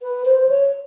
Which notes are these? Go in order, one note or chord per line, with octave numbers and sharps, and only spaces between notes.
B4
C5
C5
C#5